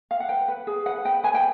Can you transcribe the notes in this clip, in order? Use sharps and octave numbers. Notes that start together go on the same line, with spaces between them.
F5
F#5
B4 G5
B4
G#4
B4 F#5
B4 G5
B4 G#5
G5